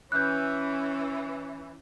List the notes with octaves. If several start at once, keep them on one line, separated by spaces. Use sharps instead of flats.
E3 C#4 F#6 G6